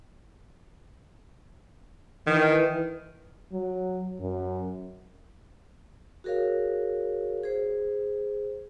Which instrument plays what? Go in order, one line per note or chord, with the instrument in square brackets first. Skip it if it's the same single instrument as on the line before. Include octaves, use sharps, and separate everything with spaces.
[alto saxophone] D#3 [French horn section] E3
[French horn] F#3
F#2
[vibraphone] F#4 G#4 A#4 C#5 F5
G#4 C5